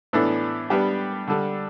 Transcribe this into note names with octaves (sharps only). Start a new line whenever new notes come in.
A2 E3 B3 D4 A4
G3 B3 D4 G4
D3 G3 D4 A4